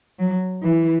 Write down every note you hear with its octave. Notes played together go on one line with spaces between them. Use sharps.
F#3
E3